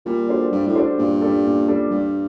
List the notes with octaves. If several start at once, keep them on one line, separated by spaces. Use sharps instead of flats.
A#2 G3
D4 F#4 A4 C5
G2 G3
A2
D4 F#4 A4 C5
G2 A#2
G3 D4 A4
A#2
G3 D4 A4
G2 G3